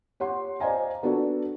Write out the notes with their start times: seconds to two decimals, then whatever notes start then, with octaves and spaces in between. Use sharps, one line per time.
0.20 G4 C#5 F#5 C6
0.60 C5 D5 D#5 F5 G#5 A#5
1.03 B3 D4 F#4 A4